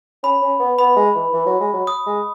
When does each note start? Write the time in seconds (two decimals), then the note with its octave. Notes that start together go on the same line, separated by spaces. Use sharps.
0.23 C#4 B5
0.42 C#4
0.59 B3
0.79 B3 B5
0.96 G#3
1.15 E3
1.33 E3
1.46 F#3
1.60 G#3
1.73 F#3
1.87 D#6
2.06 G#3